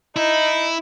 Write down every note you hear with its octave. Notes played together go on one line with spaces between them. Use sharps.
D#4 E4